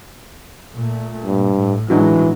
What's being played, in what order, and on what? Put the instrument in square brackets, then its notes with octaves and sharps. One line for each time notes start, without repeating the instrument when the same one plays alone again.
[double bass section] A#2 A3
[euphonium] G2
[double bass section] A2
[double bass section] A2 F#3 G#3 [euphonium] E3 [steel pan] D4 D#4 F#4